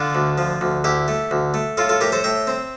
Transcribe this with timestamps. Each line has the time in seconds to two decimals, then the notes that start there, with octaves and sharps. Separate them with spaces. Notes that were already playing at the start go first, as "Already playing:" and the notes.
Already playing: D3 D4 F4
0.15 D2
0.38 F3
0.61 D2
0.84 D2 E4 G4
1.08 A3
1.31 D2
1.54 A3
1.77 A2 F4 A4
1.89 F4 A4
2.00 A2 G4 A#4
2.12 A4 C5
2.24 A2 E5 G5
2.47 C4